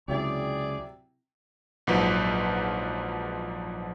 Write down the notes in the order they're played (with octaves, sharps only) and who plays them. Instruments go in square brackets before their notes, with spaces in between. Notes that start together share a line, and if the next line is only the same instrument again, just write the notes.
[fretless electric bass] C#2 [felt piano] C3 F#3 E4 [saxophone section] G#4 D5
[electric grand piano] A#1 G#2 F3 F#3 B4